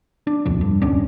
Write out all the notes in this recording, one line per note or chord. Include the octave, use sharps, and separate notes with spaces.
D4
D#1 C2 F2 F3
G2
D#1 C2 C#4 D4